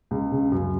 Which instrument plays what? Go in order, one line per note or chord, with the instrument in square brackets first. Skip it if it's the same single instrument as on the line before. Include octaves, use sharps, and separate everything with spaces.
[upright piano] C#2
C#3
F#2